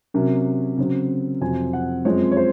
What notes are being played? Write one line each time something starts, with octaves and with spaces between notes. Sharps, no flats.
C3 F#3 C#4 A#4
C#3 F#3 C4
F2 C3 F#3 C4 G#5
F#5
F#2 F3 G#3 C4 C#5
C#5
C5